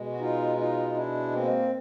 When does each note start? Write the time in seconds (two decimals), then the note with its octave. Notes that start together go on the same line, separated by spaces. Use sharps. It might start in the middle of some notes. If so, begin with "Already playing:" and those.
Already playing: B2 G#3
0.10 F#4
0.19 D#4 F4
0.57 D#4 F4
0.94 D4 E4
1.32 A#3 C4